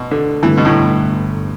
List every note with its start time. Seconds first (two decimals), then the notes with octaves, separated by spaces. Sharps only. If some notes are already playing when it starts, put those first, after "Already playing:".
Already playing: B2
0.11 D3
0.43 G1 G2 D3 E3 A3
0.57 B2
0.65 A2